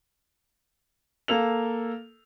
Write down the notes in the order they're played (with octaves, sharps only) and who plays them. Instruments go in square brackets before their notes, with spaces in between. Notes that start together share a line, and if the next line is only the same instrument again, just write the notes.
[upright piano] A#3 A4 F7